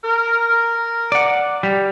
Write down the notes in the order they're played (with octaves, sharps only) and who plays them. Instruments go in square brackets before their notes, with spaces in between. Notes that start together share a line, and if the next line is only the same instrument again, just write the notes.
[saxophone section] A#4
[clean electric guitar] D5 F#5
G3